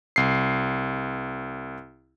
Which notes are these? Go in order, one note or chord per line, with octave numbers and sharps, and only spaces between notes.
C2 C7